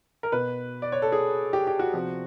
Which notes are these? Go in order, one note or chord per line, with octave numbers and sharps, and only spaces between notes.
A#4
B2 B4
D5
C#5
A4
G#4
G4
G4
F#4
C3 F3